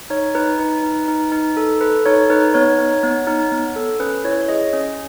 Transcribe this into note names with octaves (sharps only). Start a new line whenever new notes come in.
D#4 C#5
D#4 B4
D#4
D#4
D#4
D#4
A4
A4 B4
D#4 C#5
D#4 B4
B3 C#5
D#4
B3
D#4
B3
A4
C#4 B4
E4 C#5
C#5
G#4 D#5
C#4